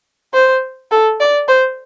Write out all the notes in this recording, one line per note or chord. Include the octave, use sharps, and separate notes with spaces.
C5
A4
D5
C5